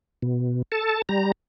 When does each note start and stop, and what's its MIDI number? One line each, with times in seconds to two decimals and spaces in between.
0.22 0.62 47
0.72 1.02 69
0.72 1.02 81
1.09 1.32 55
1.09 1.32 82